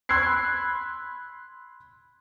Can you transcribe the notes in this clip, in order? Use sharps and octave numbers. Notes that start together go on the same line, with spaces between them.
B5 C6 E6 F#6 G#6 C7